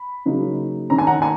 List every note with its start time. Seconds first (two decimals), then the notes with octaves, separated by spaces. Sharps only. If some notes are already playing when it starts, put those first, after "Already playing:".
Already playing: B5
0.25 C#3 F#3 A#3 D#4
0.90 D#3 A#3 C#4 A#5
0.98 G#5
1.07 F#5 A#5
1.22 G#5